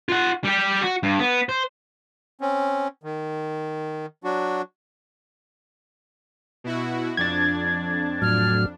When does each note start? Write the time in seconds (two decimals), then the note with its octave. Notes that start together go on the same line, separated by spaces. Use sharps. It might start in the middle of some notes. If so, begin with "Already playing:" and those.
0.09 F4 F#5
0.44 G3 G4
0.82 F#4
1.03 G2
1.19 B3
1.49 C5
2.41 C4 C#4
3.04 D#3
4.24 F#3 D4 F#4
6.64 B2 E4 F#4
7.17 F2 D4 G#6 A6
8.22 A2 F#3 F6